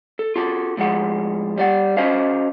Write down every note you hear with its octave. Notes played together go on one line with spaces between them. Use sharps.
A4
F4 F#4 A4
A2 F3 G#3 F#5
G3 D5 F#5
C#4 F#4 C5 D#5 F5